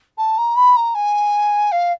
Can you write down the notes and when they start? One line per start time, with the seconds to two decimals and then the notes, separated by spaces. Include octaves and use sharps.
0.18 A5
0.38 A#5
0.56 B5
0.76 A#5
0.95 G#5
1.72 F5